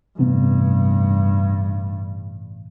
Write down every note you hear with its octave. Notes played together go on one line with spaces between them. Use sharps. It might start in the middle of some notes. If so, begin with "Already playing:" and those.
A1 G2 C3 B3